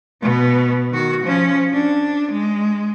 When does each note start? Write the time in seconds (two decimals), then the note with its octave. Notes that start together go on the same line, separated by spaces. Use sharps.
0.22 B2 B3
0.91 D#3 F#4
1.23 F3 C#4
1.74 D4
2.32 G#3